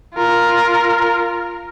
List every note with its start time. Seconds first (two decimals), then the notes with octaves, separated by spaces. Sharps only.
0.14 F4 A#4